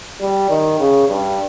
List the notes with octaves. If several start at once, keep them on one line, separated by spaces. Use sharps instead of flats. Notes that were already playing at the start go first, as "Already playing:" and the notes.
G3
D#3
C#3
G2